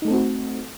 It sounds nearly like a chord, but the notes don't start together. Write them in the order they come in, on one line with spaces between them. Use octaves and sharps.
D#4 A3 A4 C4 F#4